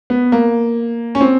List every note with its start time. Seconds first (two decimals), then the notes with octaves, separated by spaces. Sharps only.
0.10 B3
0.32 A#3
1.15 C#4
1.21 C4